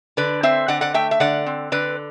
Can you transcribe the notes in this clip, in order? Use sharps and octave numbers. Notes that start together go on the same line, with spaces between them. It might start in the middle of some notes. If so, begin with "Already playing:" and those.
D3 B4 D5
C4 C5 E5
D3 D5 F#5
D5 F#5
A3 E5 G5
E5
D3 D5 F#5
C4
D3 B4 D5